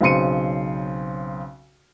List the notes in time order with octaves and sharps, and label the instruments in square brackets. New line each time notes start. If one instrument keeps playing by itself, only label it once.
[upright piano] B1 C#3 C4 C6 C#7 D#7